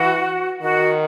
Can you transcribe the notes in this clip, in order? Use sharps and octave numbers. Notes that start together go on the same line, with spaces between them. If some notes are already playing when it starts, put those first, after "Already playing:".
Already playing: E3 F#4
D#3 F#4